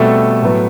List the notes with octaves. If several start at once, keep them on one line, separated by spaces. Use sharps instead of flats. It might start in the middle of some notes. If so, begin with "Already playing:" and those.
Already playing: B2 G3 A3 C4 A4
A2 F#3 B3